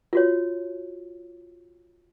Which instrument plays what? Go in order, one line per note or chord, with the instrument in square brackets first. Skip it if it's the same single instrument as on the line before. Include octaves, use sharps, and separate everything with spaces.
[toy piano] F4 F#4 C#5